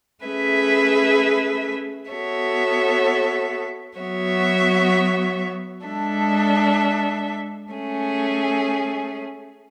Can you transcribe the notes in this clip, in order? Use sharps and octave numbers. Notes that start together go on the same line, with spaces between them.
A3 C#4 G#4 B4 E5
B3 F#4 A4 C#5 E5
F#3 B3 F#4 C#5 E5
G#3 D4 A4 E5
A3 C#4 G#4